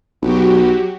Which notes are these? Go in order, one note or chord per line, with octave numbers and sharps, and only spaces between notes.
B1 F#3 F#4 G4